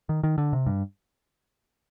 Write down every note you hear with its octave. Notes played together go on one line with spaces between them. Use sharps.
D#3
D#3
D3
C3
G2